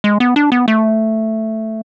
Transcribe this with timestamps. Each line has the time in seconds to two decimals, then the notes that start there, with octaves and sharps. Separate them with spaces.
0.04 G#3
0.20 B3
0.36 D4
0.52 B3
0.68 A3